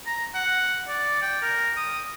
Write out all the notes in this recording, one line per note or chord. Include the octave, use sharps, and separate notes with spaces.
A#5
F#5
D5
G5
A#4
D#6